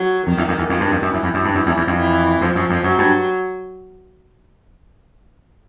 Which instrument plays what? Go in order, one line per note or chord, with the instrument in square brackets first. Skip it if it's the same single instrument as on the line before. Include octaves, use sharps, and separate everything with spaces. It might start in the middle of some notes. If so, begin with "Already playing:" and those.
Already playing: [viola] F#3
[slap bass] F2 [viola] D#3
[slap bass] E2
F2
E2
[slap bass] F2 [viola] D#3
[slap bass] G2
F2
F#2
[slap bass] F#2 [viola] E3
[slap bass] F2
F#2
G2
[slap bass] F#2 [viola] E3
[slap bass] E2
E2
F2
[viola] E3
[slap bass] F2 [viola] F3
[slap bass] F#2
F2
[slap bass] F#2 [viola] F#3
[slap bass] G2